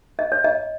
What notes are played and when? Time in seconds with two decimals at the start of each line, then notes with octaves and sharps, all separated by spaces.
0.19 D#5
0.32 C#5
0.44 D#5